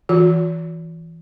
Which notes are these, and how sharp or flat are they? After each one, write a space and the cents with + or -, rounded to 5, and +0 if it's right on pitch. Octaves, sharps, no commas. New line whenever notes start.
E3 +0 F#4 -40